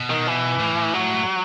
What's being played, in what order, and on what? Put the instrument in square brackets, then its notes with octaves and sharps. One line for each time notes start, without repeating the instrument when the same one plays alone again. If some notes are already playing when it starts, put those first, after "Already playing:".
Already playing: [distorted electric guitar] B2
[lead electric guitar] D#3
E3
[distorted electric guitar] A2
[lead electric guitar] F#3